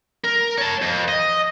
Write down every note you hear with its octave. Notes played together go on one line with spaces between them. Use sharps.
A#4
C#5 A5
F2
D#5